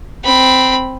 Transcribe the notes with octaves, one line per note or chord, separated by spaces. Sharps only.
C4 B5